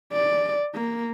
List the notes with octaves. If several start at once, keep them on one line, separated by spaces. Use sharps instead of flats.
D5
A#3